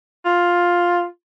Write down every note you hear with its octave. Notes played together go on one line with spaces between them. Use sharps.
F4